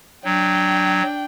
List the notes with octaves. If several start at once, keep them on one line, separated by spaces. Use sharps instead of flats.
F#3 D4 G5